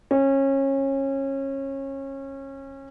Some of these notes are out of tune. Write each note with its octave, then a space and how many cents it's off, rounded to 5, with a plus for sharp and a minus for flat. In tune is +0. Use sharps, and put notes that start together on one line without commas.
C#4 -25